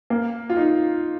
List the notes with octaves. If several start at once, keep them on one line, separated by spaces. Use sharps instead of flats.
A#3
F4
D#4